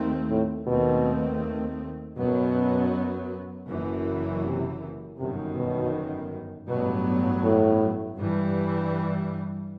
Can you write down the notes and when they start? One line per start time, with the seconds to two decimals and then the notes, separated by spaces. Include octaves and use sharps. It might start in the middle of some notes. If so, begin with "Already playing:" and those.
Already playing: D#2 D#3 A3 C4
0.30 A2
0.67 D#2 B2 D#3 A3 C4
2.17 F#2 B2 F#3 B3
3.68 F#1 F#2 E3
4.43 C3
5.18 G1 F#2 C3 D#3
5.55 B2
6.68 A1 G2 B2 F#3 B3
7.44 A2
8.18 G2 E3 G3